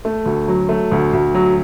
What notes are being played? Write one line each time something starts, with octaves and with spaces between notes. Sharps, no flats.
A3
D2
F#3
A3
D2
D2
F#3